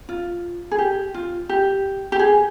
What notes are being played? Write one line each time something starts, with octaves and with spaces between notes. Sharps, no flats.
F4
G#4
G4
F4
G4
G4
G#4